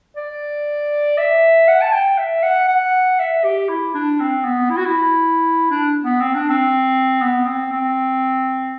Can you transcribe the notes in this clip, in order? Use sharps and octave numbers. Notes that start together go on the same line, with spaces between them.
D5
E5
F#5
A5
G5
E5
F#5
F#5
E5
G4
E4
D4
C4
B3
E4
F#4
E4
D4
B3
C4
D4
C4
B3
C4
C4